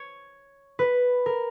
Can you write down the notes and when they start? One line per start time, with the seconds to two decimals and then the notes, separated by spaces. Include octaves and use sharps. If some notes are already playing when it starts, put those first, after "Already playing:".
Already playing: C#5
0.79 B4
1.26 A#4